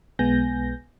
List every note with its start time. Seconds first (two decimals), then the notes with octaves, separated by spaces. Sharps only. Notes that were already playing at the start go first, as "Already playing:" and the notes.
0.19 B1 G#3 B3 G#5 G6 A#6